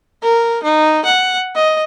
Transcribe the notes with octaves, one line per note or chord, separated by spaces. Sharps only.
A#4
D#4
F#5
D#5